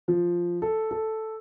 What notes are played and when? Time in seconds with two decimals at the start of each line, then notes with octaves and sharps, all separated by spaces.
0.08 F3
0.62 A4
0.91 A4